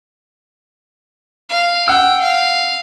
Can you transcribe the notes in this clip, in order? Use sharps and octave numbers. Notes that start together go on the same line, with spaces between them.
F5
F#5 G5 E6
F5